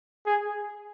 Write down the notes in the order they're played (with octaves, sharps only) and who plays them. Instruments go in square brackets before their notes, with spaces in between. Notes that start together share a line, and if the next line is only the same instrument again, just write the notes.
[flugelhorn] G#4